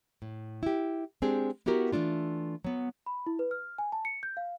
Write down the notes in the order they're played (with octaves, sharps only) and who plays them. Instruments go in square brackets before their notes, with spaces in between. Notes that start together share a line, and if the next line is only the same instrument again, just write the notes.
[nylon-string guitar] A2
E4 G4
G#3 C4 D4 G4 G#4
B3 E4 F#4 G4 A#4
E3 G#3 A3 D4 F4
F#3 B3
[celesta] B5
E4
B4
F6
G#5
A5
C#7
G6
F5